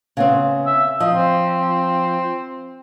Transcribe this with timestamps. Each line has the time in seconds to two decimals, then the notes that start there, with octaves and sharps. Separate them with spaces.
0.17 C#3 B3 C4
0.66 E5
1.00 F3 D#5
1.14 C4